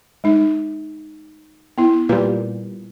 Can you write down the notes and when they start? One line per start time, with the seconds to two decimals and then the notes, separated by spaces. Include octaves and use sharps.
0.24 G#3 D#4
1.78 B3 E4
2.09 A#2 G3 B4